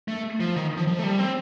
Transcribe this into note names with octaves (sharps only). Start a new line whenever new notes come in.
A3
F3
D#3
F3
F3
A3
G3
C4